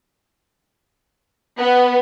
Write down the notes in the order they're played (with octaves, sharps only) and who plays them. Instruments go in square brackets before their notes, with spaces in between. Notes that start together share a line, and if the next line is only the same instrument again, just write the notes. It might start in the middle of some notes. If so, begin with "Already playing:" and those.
[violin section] B3